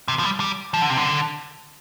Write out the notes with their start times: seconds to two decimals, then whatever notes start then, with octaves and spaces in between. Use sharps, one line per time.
0.08 C3
0.19 F3
0.24 G3
0.40 G3
0.74 F3
0.82 D3
0.90 C3
0.97 D3